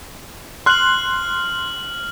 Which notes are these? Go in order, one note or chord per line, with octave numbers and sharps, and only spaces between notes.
C6 F6 F#6 F#7